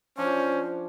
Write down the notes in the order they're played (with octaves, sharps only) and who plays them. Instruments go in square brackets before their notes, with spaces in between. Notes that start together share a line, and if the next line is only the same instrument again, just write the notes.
[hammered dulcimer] F3 D4 [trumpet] C#4 [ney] C5